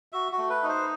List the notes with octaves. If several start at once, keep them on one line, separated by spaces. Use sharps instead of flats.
F#4 E5
F#4
A3
B4
D#4
C5